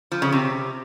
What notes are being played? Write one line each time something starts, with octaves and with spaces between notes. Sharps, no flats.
F3
C#3
C3